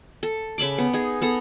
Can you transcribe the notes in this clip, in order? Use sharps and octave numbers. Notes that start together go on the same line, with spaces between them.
A4
C#3 E5 B5 D6
B3
D#4 G#4
B3 A4 A#5